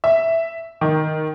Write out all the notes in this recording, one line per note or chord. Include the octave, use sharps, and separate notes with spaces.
E5
D#3